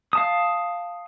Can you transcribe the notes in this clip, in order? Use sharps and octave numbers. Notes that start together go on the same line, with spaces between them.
F5 A5 D#6